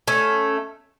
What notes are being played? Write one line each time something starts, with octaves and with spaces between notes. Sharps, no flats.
A3 C#4